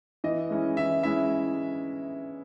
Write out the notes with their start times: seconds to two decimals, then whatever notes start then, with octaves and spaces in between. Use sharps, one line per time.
0.24 E3 D#5
0.50 G#3 C#4 E4
0.77 E3 E5
1.03 G#3 C#4 E4 E5